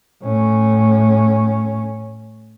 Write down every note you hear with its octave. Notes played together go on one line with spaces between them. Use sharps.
A2 C#4